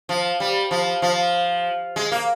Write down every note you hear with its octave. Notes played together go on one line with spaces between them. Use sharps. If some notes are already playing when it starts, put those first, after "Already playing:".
F3
G3
F3
F3
G#3
A#3